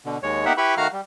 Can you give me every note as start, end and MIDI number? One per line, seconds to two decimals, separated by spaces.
0.05 0.18 47
0.05 0.18 50
0.23 0.45 39
0.23 0.45 56
0.23 0.45 73
0.45 0.53 58
0.45 0.53 59
0.45 0.53 63
0.45 0.53 67
0.45 0.53 76
0.45 0.53 78
0.57 0.75 64
0.57 0.75 67
0.57 0.75 71
0.57 0.75 83
0.57 0.75 85
0.77 0.87 51
0.77 0.87 57
0.77 0.87 66
0.77 0.87 77
0.77 0.87 82
0.77 0.87 89
0.93 1.01 55